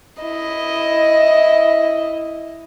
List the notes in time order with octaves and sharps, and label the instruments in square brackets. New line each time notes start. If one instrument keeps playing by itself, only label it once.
[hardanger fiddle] E4 D#5